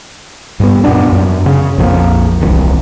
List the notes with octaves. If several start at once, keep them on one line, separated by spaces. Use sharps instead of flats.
G2 B3
F#2 A#2 B3 D4
F#2
C#3
A#1 F2 F3 A#3
D#1 C2 E3